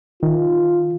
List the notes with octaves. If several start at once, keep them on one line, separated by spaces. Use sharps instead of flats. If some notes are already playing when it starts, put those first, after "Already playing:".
D#3 F4